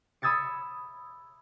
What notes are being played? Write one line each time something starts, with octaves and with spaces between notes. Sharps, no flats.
B5 D#6 E6 G#6 A6 C#7